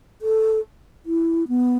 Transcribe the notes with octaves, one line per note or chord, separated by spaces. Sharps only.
A4
E4
B3